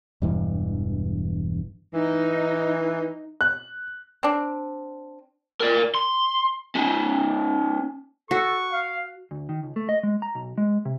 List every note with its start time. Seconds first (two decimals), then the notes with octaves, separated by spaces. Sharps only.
0.22 E1 G2 E3
1.94 E3 D#4
3.41 F#6
4.23 C4 D4
5.61 A#4 D5
5.95 C6
6.76 C#4 D#4
8.31 F#4 A4 C#6
8.73 F5
9.31 D2
9.49 D#3
9.63 C#2
9.76 A3
9.89 D#5
10.03 G#3
10.22 A#5
10.35 B1
10.58 G#3
10.85 C3